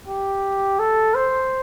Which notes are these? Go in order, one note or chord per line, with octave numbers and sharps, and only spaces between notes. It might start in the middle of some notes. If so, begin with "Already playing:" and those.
G4
A4
C5